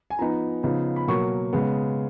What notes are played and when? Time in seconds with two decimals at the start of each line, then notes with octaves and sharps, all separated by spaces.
0.10 G#5
0.19 F3 B3 D#4 A#5
0.63 C#3 F3 B3 D#4
0.96 B5
1.08 B2 F#3 A#3 C#6
1.53 C#3 G#3 B3